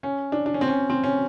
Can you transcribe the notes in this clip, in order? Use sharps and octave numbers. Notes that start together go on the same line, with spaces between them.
C#4
D4
D4
C#4
C4
C#4
C4
C#4